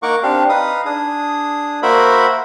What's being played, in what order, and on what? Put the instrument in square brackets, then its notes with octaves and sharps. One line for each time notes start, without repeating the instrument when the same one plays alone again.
[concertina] A#3 D#4 A#4 F#5 C#6 D6
C4 D4 G4 F5
D#4 B4 F5 D#6
D4 G#4 D#6
A#3 F#4 A#4 C5 E5 B5